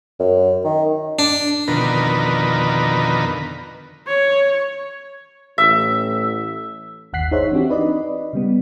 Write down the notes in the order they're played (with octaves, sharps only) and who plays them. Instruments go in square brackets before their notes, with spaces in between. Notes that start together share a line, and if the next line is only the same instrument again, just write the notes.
[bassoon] F#2
D#3
[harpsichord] D4
[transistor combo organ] F2 B2 D3 D#3 A#4 B4
[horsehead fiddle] C#5
[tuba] A1 [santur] E5
[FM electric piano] G1 D#2 F#5 F#6 B6 C7
D#4 G#4 C5 C#5 E5
E3 C4 D4 F#4 G4
D#4 B4 D5 D#5
C#3 G3 B3